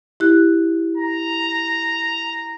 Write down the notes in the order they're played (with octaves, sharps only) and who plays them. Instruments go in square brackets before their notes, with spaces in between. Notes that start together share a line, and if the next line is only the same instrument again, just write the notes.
[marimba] E4 G4 F#6
[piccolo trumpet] A#5